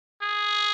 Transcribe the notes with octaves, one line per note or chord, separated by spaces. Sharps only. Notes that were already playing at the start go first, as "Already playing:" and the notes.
G#4